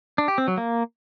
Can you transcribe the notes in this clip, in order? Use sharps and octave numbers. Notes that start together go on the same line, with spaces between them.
D4
G4
C4
F#3
A#3